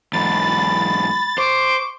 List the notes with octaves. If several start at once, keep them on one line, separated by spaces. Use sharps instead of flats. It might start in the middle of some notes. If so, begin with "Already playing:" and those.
E2 G#2 B5 A6
C5 C#6 D6